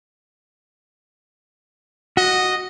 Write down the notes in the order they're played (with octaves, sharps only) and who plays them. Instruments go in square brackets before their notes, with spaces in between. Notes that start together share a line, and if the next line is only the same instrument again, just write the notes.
[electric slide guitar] F#4 [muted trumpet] D#5